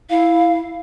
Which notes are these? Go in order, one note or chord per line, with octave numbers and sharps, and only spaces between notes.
E4 F5